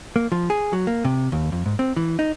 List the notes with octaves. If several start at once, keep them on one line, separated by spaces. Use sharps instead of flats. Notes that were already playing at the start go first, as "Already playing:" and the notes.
A#3
F3
G#4
F#3
A#3
C3
D#2
F2
G#2
C4
E3
D#4